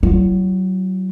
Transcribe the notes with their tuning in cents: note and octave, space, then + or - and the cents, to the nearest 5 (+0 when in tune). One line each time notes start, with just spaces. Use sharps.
F#3 +20 E4 +45